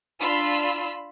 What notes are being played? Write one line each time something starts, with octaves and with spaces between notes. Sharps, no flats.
D4 F4 B5 E6